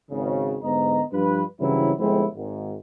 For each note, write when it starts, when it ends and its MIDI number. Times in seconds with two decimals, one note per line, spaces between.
0.11 0.57 32
0.11 0.57 49
0.63 1.02 44
0.63 1.02 50
0.63 1.02 59
0.63 1.02 75
0.63 1.02 82
1.12 1.43 43
1.12 1.43 53
1.12 1.43 62
1.12 1.43 65
1.12 1.43 71
1.60 1.92 43
1.60 1.92 49
1.60 1.92 52
1.60 1.92 54
1.60 1.92 60
1.60 1.92 64
1.98 2.26 31
1.98 2.26 53
1.98 2.26 56
1.98 2.26 60
1.98 2.26 64
2.36 2.76 32
2.36 2.76 44